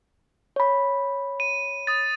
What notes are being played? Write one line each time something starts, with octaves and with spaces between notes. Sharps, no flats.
C#5 B5
D#7
D#6 A6